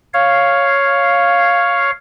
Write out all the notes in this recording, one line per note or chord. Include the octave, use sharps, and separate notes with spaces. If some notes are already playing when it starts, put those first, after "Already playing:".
C#5 F5